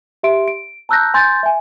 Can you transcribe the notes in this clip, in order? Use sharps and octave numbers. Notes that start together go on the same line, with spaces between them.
G4 E5 C6 D7
D7
A5 A#5 E6 F#6 G6 A#6
G#5 C6 G6 A6
E5 G#5